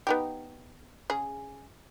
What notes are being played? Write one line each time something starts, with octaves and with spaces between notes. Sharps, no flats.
B3 D#4 G4
C#3 G#4